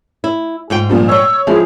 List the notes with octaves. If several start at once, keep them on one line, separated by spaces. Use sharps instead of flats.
E4
G#2 F4 G5
A#2 F3 G3
C#5 C#6 E6
F3 G#3 E4 G#4